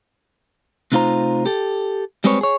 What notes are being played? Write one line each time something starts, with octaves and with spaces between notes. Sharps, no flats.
C3 A3 D#4 F4 C5 A#5
G4 A4
G3 G#3 C4 G#4 B4 C#5
G#4 C#5